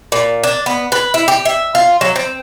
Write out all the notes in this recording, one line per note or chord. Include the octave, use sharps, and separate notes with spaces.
A#2
D4
B3
B4
E4
G4
E5
F4
F#3
C4